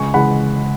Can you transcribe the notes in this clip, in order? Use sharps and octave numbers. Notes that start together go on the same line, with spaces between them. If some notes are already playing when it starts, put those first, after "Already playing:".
Already playing: C#2 G#5 C#6
C#3 E3 G#3 F#5 B5